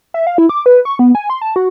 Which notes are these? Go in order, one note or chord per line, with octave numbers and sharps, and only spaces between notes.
E5
F5
E4
D6
B4
C#6
B3
G#5
C6
A5
F#4